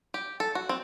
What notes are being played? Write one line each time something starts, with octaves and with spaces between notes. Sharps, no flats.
G4
A4
F#4
C4